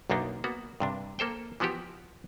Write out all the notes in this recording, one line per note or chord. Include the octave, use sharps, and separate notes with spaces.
B1 F#2 A#3 D4 D#4
A#3 B3 F#4
G2 C3 D4
A#3 A4 C5 G5
E3 F3 B3 F#4 G4